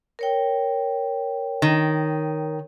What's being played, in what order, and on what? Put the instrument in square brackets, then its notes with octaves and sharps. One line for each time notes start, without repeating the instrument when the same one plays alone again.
[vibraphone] A#4 C#5 G5
[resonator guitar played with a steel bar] D#3